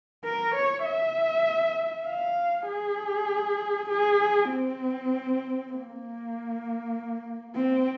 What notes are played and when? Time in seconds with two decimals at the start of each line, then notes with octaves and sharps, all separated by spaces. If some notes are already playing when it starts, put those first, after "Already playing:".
0.24 A#4
0.55 C#5
0.85 E5
2.07 F5
2.68 G#4
3.89 G#4
4.50 C4
5.72 A#3
7.55 C4